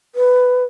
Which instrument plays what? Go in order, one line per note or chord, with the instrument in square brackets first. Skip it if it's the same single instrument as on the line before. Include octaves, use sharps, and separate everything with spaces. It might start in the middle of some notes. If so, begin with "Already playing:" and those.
[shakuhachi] B4